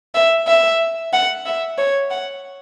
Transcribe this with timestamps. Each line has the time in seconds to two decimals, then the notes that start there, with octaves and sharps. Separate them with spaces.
0.14 E5
0.47 E5
1.13 F#5
1.46 E5
1.78 C#5
2.10 F#5